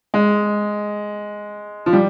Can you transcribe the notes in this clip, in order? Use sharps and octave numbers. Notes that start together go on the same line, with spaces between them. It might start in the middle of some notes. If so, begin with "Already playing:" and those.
G#3
F3
G3